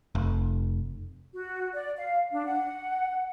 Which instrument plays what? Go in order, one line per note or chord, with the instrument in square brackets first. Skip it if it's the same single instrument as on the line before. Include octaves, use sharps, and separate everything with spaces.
[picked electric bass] F1
[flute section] F#4
D5
F5
D4
F#5